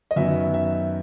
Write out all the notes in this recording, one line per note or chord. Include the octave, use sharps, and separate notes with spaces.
D#5
F#2 D#3 F#3 B3 E5
E5